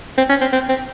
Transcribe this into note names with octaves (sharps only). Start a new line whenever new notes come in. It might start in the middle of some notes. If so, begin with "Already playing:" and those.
C4
C#4
C4
C4
C4